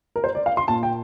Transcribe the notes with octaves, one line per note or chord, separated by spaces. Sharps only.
A#4
C5
D5
F5
C6
A#2 A5
G5